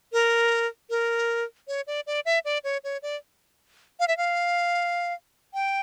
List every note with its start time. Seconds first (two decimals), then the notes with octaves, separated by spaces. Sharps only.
0.13 A#4
0.90 A#4
1.68 C#5
1.87 D5
2.07 D5
2.26 E5
2.45 D5
2.64 C#5
2.84 C#5
3.03 D5
4.00 F5
4.08 E5
4.17 F5
5.54 G5